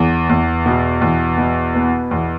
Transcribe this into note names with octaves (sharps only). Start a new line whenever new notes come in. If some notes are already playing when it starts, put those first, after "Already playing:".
Already playing: E2
E2
B2
E2
B2
B3
E2